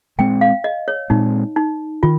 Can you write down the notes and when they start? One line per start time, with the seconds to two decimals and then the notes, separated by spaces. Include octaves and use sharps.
0.18 A#2 G#3 C4 G5
0.41 F5
0.64 D#5
0.88 C#5
1.10 A#2 G#3 C4 D#4
1.56 D#4
2.03 D#3 F4